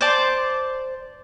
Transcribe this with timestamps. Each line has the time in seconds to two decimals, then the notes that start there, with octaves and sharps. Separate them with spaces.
0.01 C5 D5 A5